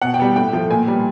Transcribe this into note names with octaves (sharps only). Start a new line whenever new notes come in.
B2 F#5
G5
G3 B3
A2 G5
F3 A3
A#2 G#5
G3 B3